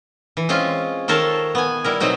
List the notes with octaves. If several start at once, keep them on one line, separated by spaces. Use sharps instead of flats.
E3
G#3 C4 C#4 F4
D#3 A4 A#4 C5 C#5 A5
B3 G#5
G3 E4 A#4
B2 F#3 C4 D#4 F#4